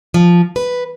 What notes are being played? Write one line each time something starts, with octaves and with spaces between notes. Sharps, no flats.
F3
B4